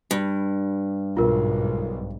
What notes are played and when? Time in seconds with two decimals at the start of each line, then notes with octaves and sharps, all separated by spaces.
0.11 G2
1.17 B1 G#2 F4 A#4